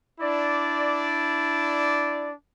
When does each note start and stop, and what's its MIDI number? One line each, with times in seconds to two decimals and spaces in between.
0.21 2.31 62
0.21 2.31 64
0.21 2.31 74